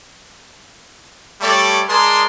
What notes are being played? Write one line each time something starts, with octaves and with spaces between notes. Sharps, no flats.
G3 A3 G4 A4 C#5 D5
G#3 G#4 A#4 D5 A5 C6